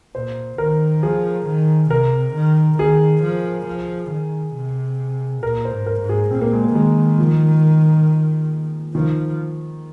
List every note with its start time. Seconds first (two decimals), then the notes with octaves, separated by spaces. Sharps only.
0.15 A#2 C5
0.58 D#3 A#4
1.02 F3 G#4
1.47 D#3
1.90 C3 A#4
2.34 D#3
2.78 D#3 G#4
3.23 F3
3.67 F3
4.11 D#3
4.54 C3
5.43 A#2 A#4
5.65 C5
5.72 G#2
5.86 A#4
6.01 G#2
6.09 G#4
6.31 A#2 C4
6.41 A#3
6.53 G#3
6.64 A#3
6.74 D#3 G#3
7.19 F3
8.95 D#3 F3